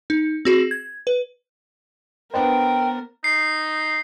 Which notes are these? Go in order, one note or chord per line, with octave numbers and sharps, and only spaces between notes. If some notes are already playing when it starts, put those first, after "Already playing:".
D#4
C4 F#4 G#4
G#6
B4
B3 D4 A#4 C5 G5
D#4 C7